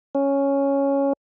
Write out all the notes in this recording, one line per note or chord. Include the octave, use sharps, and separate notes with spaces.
C#4